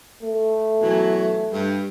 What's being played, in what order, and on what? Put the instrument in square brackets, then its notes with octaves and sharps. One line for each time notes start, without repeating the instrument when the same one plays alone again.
[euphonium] A3
[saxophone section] B2 E3 F#3
G2